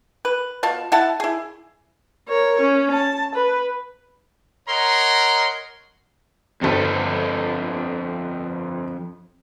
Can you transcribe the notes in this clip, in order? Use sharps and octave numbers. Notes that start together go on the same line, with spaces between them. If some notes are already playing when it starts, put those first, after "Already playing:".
B4
B2 F4 A5
E4 F#5 A5
E4 G#4
A#4 C#5
C#4
A5
B4
A#4 C#5 D#5 F#5 A#5 C6
G1 F2 C4 A4 B4